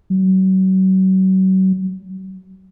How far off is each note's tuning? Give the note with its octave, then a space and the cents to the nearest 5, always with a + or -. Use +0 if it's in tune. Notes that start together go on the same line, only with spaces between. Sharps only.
F#3 +35